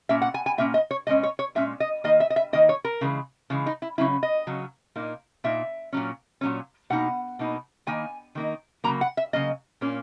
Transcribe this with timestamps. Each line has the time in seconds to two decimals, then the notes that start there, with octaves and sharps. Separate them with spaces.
0.09 A#2 A#3 C#4 E5
0.22 F#5
0.34 G#5
0.46 G#5
0.58 A#2 A#3 C#4 E5
0.74 D#5
0.91 C#5
1.07 A#2 G#3 C#4 D#5
1.23 C#5
1.39 C#5
1.55 A#2 G#3 C#4 E5
1.80 D#5
2.04 D#3 A#3 D#4 D#5
2.20 E5
2.30 D#5
2.36 E5
2.53 D#3 A#3 D#4 D#5
2.69 C#5
2.85 A#4
3.01 C#3 E3 G#3
3.50 C#3 E3 G#3
3.66 D#4
3.82 E4
3.98 C#3 F#3 C#4 E4
4.23 D#5
4.47 C#3 F#3 C#4
4.96 A#2 A#3 D#4
5.44 A#2 A#3 D#4 E5
5.93 A#2 F#3 C#4
6.41 A#2 F#3 C#4
6.90 B2 A#3 D#4 F#5
7.39 B2 A#3 D#4
7.87 D#3 A#3 D#4 G#5
8.35 D#3 A#3 D#4
8.84 C#3 F#3 A#3 A#5
9.01 F#5
9.17 E5
9.33 C#3 F#3 A#3 D#5
9.81 A#2 A#3 C#4